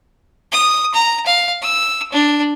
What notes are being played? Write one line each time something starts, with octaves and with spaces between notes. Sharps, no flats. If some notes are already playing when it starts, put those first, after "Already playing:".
D#6
A#5
F5
E6
D4